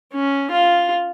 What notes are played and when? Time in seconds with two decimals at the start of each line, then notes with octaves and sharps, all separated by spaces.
0.13 C#4
0.51 F4